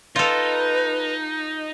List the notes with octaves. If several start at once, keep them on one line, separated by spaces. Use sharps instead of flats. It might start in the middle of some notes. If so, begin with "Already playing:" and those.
D#4 F4 A4 B4